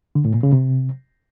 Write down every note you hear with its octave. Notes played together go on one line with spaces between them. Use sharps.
D3
A2
A#2
C#3
C3